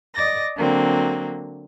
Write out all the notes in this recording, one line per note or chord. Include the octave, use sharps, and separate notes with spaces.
D5 D#5 D6 A6 A#6
D3 F#3 A#3 C4